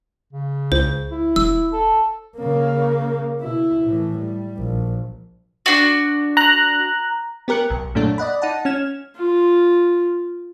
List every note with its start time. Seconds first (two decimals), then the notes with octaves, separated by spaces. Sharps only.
0.33 C#3
0.72 C#2 C5
1.11 E4
1.36 E1 E6
1.72 A4
2.37 C#3 A#3
3.41 B2 E4
3.85 A2 E3
4.18 G3
4.57 A#1
5.66 D4 F#4
6.37 A#5 F#6
7.48 B3 G4 A#4 F#6 C#7
7.70 B1
7.95 F#2 A#2 A3 D4
8.18 D5 D#5 F#5 B5
8.42 D#4 F#5 A5
8.65 C#4 F6 G#6 E7
9.16 F4